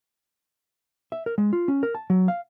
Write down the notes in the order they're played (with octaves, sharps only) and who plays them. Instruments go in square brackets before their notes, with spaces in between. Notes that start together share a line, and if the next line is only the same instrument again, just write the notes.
[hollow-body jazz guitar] E5
A#4
G#3
F4
C#4
A#4
A5
F#3
F5